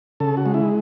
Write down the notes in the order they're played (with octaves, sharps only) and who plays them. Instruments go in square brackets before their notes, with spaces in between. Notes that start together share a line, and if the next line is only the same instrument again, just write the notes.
[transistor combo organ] C#3 A4
F#4
G#3
E4